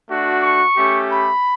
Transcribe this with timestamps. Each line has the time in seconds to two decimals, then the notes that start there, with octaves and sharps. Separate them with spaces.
0.09 A3 D4 F#4
0.43 C#6
0.77 A3 C#4 G4
1.11 B5